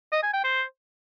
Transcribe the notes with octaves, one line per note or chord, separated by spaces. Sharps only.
D#5
G#5
G5
C5